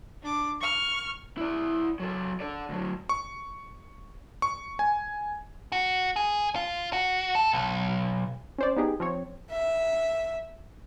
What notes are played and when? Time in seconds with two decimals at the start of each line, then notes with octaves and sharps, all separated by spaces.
0.22 D4 D6
0.61 C#6 F6
1.37 E4 D5
2.00 F#3 A4
2.41 A4 D5
2.69 D2 F#3
3.09 C#6
4.42 C#6
4.79 G#5
5.72 F#4
6.16 G#4
6.56 F4
6.93 F#4
7.35 A4
7.53 B1
8.58 C#4 C5 D5
8.77 B3 D#4 G4 G#4
9.00 F3 C4 C#5
9.51 E5